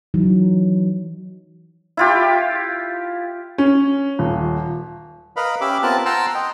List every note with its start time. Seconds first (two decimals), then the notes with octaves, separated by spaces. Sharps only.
0.14 E3 F#3 D#4
1.97 E4 F4 G4
3.58 C#4
4.19 D#1
5.36 A#4 B4 D#5 F5 B5
5.61 C#4 G4 E5 B5 D6
5.83 B3 C4 F4 A#4 A5 F#6
6.05 F#5 G5 A5 A#5 C6 E6
6.35 D#5 G5